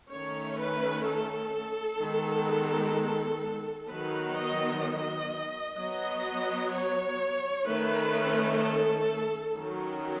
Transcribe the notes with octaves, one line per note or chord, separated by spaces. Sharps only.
D#3 A3 C#4 C#5
B4
A4
D#3 G#3 B3
D#3 F#3 B3 B4
D#5
D#5
F#3 B3 D#5
C#5
D#3 A3 C#4 B4
A4
D#3 F#3 C#4